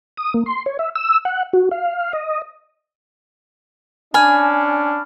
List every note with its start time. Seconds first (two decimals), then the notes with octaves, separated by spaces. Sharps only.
0.17 D#6
0.34 A#3
0.46 C6
0.66 C#5
0.79 E5
0.95 E6
1.25 F#5
1.53 F#4
1.71 F5
2.13 D#5
4.14 C#4 D4 G#5 B5 F6